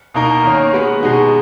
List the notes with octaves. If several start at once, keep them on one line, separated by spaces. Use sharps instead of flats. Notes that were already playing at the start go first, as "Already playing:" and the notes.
B2 A#3 D#4 A#4
D#3 A#3 C#4
G#3 B3 F#4 B4
B2 G#3 D#4 F#4